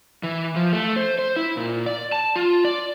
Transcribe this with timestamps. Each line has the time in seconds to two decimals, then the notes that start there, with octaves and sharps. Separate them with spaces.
0.23 E3
0.56 F3
0.73 A3
0.96 C5
1.19 C5
1.36 E4
1.57 A#2
1.86 D5
2.12 A5
2.36 F4
2.65 D5